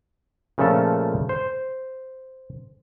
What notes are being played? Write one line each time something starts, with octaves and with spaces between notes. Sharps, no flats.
A#2 C#3 F3 A3 A4
C5